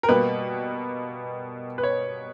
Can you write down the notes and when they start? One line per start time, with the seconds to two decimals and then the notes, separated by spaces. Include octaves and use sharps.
0.03 A#4
0.09 B2 G3 A#3 B4
1.78 B4
1.83 C#5